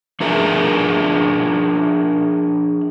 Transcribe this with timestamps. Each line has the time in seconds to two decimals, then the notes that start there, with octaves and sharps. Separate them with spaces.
0.20 F3 D4 G#4 A#4 E5 A#5